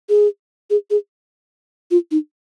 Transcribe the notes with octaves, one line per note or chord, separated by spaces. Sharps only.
G#4
G#4
G#4
F4
D#4